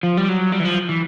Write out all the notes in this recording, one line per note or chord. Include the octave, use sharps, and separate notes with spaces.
F3
G3
F#3
G3
E3
F3
E3